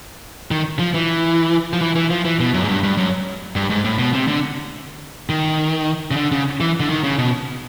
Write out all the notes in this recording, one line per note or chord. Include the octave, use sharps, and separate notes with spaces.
D#3
F3
E3
F3
E3
E3
F3
E3
B2
F#2
G#2
G2
G2
F#2
G2
G#2
A2
B2
C3
D3
D#3
C#3
D3
C#3
E3
D3
D#3
C#3
B2